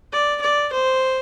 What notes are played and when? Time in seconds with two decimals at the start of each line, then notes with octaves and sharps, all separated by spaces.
0.13 D5
0.42 D5
0.73 C5